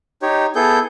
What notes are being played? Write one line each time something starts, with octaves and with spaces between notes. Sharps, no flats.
D#4 G4 C#5
B3 E4 G#4 A4 G6